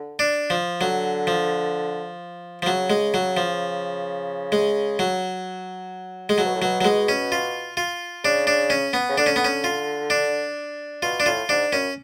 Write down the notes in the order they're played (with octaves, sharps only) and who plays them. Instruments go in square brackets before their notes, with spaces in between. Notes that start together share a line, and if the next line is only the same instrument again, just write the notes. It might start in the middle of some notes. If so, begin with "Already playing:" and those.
Already playing: [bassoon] D3
[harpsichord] D4
F3
[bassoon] D3 [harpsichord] F#3
[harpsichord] F3
F3
[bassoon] C#3 [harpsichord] F#3
[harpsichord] G#3
F#3
F3
G#3
F#3
G#3
[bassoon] C#3 [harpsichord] F#3
[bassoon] B2
A2
[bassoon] B2 [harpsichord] F#3
[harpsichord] F#3
G#3
C#4
F4
F4
[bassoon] C#3 [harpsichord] D4
[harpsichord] D4
C#4
B3
[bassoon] C#3
[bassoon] D3 [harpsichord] D4
[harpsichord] C#4
B3
C#4
F4
D4
[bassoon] B2 [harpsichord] F4
[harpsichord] D4
[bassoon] A2 [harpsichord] F4
[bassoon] G#2 [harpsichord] D4
[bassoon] F#2 [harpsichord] C#4